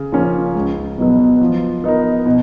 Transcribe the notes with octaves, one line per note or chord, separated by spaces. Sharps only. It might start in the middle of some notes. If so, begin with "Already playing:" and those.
Already playing: C#3
F3 A#3 C#4
C#2
B2 F#3 B3
F3
B3 D#4 A#4
B2